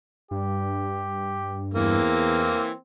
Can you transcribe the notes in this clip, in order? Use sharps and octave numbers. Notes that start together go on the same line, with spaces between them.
G2 G4
E2 E3 A#3 C4